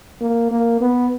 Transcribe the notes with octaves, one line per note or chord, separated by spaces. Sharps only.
A#3
A#3
B3